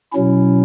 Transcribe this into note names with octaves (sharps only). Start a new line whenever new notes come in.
B2 F#3 C#4 E4